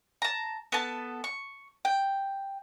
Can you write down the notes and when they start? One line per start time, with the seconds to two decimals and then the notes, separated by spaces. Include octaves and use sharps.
0.22 A5 A#5
0.72 B3 A4 A5
1.24 C#6
1.85 G5